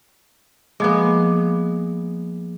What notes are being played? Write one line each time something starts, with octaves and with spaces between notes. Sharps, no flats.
F3 G#3 A#3 B3 D6